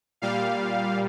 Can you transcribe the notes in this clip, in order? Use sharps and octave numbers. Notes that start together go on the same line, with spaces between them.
A#2 G3 F5